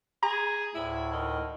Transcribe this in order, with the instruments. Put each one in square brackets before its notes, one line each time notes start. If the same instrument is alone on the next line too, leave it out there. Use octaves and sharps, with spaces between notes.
[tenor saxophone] G#4 [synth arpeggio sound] A#5
[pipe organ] D2 A2 [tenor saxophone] E4
[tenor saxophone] D#3